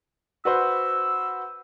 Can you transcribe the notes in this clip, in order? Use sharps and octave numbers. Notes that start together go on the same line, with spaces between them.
F#4 B4 C5 E6